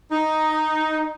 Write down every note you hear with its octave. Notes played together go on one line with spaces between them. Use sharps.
D#4